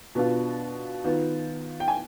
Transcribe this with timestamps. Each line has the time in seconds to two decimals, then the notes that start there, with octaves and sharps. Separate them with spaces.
0.15 B2 B3 D4 F4
1.04 D#3 B3 F4
1.80 G5
1.88 G#5